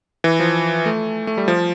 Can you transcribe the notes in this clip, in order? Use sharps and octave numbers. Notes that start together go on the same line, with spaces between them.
E3
F3
A3
A3
G3
F3